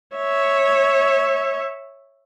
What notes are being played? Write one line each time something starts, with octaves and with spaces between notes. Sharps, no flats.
C#5 E5